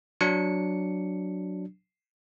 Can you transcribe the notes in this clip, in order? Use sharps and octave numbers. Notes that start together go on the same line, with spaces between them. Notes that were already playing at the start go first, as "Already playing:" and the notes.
F#3 D4 C#7